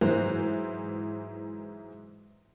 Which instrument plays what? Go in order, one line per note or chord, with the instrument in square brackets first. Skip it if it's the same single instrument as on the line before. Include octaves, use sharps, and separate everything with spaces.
[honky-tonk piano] G#2 E3 F#3 C5 F#6